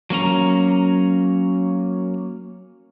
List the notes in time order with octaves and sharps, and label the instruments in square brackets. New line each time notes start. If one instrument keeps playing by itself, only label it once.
[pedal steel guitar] F#3 A#3 C#4 A#5